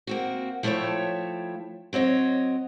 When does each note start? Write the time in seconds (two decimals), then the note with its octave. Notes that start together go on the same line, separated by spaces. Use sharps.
0.07 A#3 C4 F#4
0.63 F3 A3 E4 F#4 C#5 G5
1.93 F#3 C4 C#5 D#5